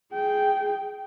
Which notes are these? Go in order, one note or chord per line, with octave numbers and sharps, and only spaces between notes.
G#4 G5